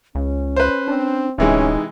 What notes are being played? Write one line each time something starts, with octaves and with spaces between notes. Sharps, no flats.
C#2 C#4
B4 C5
C4 D4
D1 C3 E3 G#3 C#4 D#4